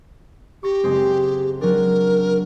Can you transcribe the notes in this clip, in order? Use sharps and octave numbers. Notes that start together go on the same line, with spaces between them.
G4 C#6 A#6
F#1 G#3 C4
F#3 D4 A#4